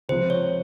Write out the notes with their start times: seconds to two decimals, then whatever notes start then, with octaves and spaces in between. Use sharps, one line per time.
0.09 C#2 C3 F3 C5
0.30 C#5